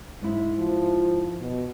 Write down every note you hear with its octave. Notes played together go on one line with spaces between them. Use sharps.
G#2 E4
F3
B2